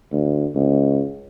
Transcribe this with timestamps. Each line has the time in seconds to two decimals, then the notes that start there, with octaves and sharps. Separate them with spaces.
0.12 D2
0.55 C#2